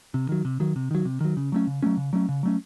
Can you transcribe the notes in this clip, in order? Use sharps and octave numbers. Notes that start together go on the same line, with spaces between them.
C3
D#3 F#3
C3
D#3 F#3
C3
D#3 F#3
C3
D#3 F#3
C#3
F#3 A3 C#4
C#3
F#3 A3 C#4
C#3
F#3 A3 C#4
C#3
F#3 A3 C#4